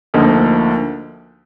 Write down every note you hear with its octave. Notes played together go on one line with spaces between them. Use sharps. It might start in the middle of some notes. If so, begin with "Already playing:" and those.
D2 D3 F3 A#3 D#4